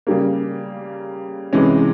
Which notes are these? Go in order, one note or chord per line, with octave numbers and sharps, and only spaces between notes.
C#3 G3 A#3
C3 E3 G#3 C#4